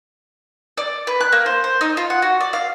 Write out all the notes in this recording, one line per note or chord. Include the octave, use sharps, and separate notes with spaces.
D5
B4
F#6
A#3
C5
C5
D#4
F4
F#5
F#4
D5
F5